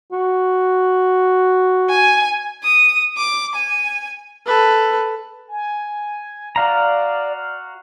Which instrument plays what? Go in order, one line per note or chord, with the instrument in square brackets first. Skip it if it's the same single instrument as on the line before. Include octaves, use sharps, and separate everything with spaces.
[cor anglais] F#4
[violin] G#5
D#6
D6
G#5
[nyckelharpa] A4 B4
[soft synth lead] G#5
[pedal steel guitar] F#4 F5 A#5 [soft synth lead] D5